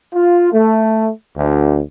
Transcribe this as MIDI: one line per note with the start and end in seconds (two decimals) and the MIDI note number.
0.15 0.52 65
0.52 1.10 57
1.37 1.79 38